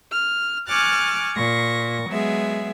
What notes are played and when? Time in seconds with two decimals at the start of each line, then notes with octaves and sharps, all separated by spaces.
0.10 F6
0.67 G#5 C#6 D6 F6 F#6 A6
1.34 A#2 C#6 A#6
2.09 F#3 G#3 B3 G#4 E5